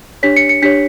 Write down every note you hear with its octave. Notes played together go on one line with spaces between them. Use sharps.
D4 G4 C#5 B6
C#7
C#7
D4 G4 C#5 B6